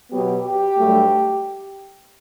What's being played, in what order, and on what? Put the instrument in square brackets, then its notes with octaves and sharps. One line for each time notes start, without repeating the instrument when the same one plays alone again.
[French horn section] B2 F#3 B3 G4
G4
G2 F#3 A3